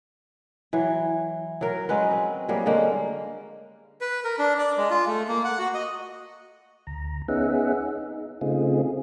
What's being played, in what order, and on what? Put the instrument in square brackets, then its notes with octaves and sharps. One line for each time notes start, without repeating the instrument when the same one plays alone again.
[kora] E3 F#3
F#3 A#4
F#3 G#3 C#4 B4
C4
F#3 G3 A#3 G#4
D3 G#3 A#3 C#4
[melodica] B4
A#4
D4
D5
G#3
F4
A3
A#3
F#5
F#4
D#5
[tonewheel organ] D2 A#5
B3 C#4 D#4 G#4 E5 F#5
D#4
C#3 A3 C4 D#4 F4 G#4